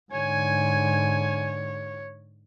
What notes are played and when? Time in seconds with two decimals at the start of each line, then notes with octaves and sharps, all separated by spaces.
0.12 G#2 D3 C#5 G#5